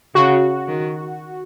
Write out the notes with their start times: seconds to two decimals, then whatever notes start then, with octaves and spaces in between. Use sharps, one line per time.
0.15 C#3 F#4
0.68 D#3